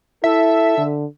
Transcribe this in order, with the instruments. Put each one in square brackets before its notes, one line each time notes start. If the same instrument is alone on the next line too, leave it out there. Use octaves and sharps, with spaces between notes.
[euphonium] E4 [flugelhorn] A4 [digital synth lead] E5
[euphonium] D3